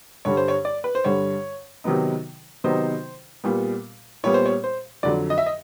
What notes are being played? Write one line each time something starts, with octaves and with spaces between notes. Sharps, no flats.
G2 D3 G3 C#5
C5
C#5
D5
B4
C5
G2 D3 G3 C#5
C3 D#3 F#3 B3 D#4
C3 D#3 F#3 B3 D#4 C5
A#2 G3 B3
A#2 G3 B3 C#5
C5
C#5
C5
F2 D3 F#3 D5
D#5
E5
D#5